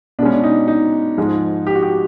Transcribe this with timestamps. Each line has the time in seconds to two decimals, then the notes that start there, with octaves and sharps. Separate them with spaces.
0.19 B2 D4
0.22 G#3 C#4
0.33 D4
0.43 D#4
0.68 D#4
1.18 G#2 F3 G#3
1.67 G4
1.75 F#4
1.83 G4